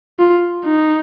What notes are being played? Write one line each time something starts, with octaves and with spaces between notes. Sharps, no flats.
F4
D#4